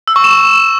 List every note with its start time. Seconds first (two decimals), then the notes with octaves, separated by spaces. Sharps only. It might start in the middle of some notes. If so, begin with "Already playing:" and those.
0.08 E6
0.16 C#6
0.24 E7